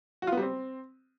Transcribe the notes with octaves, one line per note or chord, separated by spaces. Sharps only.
F#4
F4
B3
G3
C4